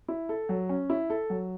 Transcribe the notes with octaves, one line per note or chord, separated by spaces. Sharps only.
E4
A4
F#3
C#4
E4
A4
F#3